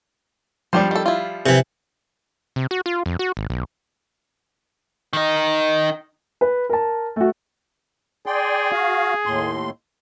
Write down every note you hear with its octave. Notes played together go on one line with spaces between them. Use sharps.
F3 G3 D4 G4 C5
D#3 A4
E4 F4
C3 E3
C3
F#4
F4
F2
F#4
G#1
B1
D#3 D#4
B4
A#4 A5
A3 F#4
G#4 D5 G5 C6
F#4 F5
D#2 A2 C6